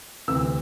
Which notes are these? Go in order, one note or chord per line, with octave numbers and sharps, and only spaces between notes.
D2 C3 E3 E6